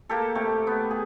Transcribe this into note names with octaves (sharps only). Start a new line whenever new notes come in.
A#3 G4 A4
C3 A3 G4
B3
G#4